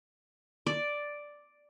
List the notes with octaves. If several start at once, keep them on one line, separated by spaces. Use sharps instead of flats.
D5